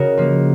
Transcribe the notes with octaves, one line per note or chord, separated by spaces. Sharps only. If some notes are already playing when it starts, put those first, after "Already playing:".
Already playing: C#3 F#4 A#4 D#5
F3 A#3